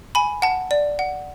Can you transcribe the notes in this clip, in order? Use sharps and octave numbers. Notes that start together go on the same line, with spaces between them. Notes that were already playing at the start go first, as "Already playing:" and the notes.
G#5 B5
F#5 A5
D5
F#5